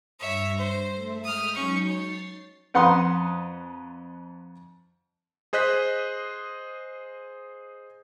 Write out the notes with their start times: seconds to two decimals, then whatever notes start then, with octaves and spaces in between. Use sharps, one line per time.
0.20 G2 C#5 E5 A#6
0.58 C5
0.92 A3 A4 E5
1.24 G#3 D#6 F6 G6 B6
1.55 F#3 C#4 D#4 C#6 G6
1.89 C#5 A6 C7
2.74 F2 B4 F#5 A#5 C6 D#6
5.53 G#4 C5 D#5 F#6 B6